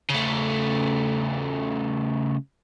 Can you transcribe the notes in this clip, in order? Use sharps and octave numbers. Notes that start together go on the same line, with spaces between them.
C#3 A3